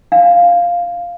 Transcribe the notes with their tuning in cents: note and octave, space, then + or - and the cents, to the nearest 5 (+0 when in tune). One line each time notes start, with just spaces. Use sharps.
D4 +0 F5 +0